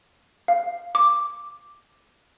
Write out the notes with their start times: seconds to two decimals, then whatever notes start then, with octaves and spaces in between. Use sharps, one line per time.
0.48 F5
0.95 D6